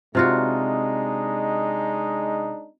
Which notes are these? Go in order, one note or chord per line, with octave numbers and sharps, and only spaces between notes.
C3 G#3 D4 D#4 F4 F#4